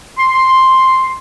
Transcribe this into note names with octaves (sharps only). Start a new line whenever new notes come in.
C6